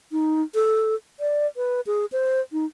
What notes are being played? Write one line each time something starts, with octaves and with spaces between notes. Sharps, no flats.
D#4
A4
D5
B4
G#4
C5
D#4